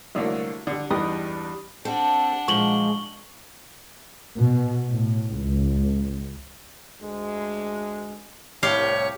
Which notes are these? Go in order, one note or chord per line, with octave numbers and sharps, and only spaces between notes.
C2 D3 F#3 A3 A#3
D3 G3
E2 G2 D#4 B4 G5 D#6
G3 C4 D4 A4 F#5
A#2 F3 F#3 G#3 C#6 F#7 G7
B2
A2
C#2
D2 G#3
C2 A2 G4 C#5 F5 C6